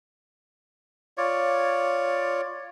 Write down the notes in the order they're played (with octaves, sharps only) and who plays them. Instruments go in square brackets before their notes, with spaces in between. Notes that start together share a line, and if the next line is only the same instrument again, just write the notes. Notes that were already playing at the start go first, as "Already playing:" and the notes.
[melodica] F4 C#5 D5